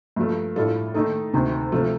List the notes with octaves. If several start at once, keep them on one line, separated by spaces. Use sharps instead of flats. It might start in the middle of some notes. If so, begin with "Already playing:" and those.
G2 F3 A3
A2 G3 D4 F4 A4
D#3 A3 D#4 A4
D2 C3 D#3
C3 F3 A3